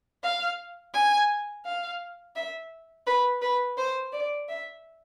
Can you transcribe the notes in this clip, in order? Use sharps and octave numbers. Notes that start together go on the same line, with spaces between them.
F5
G#5
F5
E5
B4
B4
C5
D5
E5